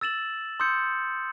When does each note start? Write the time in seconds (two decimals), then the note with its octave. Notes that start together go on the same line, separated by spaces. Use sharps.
0.01 E6 A6 E7 F#7
0.60 C6 D#6 E6 G6 C#7